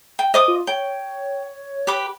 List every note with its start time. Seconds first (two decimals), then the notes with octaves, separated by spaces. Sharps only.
0.19 G5
0.34 C5 D#5 D6 D#6
0.48 F4
0.67 C#5 G5
1.87 G4 B4 D6